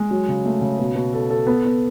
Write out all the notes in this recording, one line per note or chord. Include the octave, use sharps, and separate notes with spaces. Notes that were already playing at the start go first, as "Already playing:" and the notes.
Already playing: G#3
F#3
C#3
A3
C#3
B2
B2
A4
A4
B3
B3